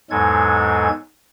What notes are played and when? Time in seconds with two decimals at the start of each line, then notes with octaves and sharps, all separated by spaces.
0.10 E2 G#2 F#3 G#3 A4 G#6